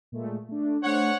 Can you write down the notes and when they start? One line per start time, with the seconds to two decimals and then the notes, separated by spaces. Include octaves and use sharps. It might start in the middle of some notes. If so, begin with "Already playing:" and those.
0.12 A#2 G#3 A3
0.49 A3 D4
0.83 A3 D4 C5 C#5 F#5